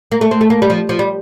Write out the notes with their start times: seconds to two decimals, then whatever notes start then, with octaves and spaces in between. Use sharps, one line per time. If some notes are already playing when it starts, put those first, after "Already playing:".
0.12 A#3
0.21 A3
0.31 C4
0.41 A3
0.50 A#3
0.62 G3
0.70 F3
0.89 F3
0.99 G3